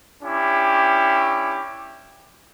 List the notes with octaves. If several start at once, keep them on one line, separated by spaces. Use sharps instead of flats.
C#4 D4 E4 G4